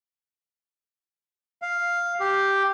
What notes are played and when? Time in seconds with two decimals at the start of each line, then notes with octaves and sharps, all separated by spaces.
1.62 F5
2.20 G4